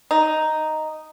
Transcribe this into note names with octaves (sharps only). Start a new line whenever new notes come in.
D#4